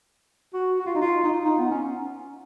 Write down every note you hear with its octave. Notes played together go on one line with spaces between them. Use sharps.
F#4
F#4
F4
D#4
F4
D#4
F4
D#4
B3
C#4